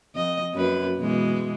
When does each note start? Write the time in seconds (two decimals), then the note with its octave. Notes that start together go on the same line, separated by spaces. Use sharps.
0.15 F2 D#5
0.54 F#2 A#3 B4
0.97 B2 E3 G#3